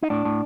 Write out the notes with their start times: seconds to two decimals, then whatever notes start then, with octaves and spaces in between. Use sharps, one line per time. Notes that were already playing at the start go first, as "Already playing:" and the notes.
0.03 D#4
0.10 A2 D4
0.25 A2